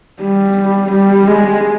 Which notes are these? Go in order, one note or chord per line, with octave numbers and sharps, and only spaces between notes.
G3
G3
G#3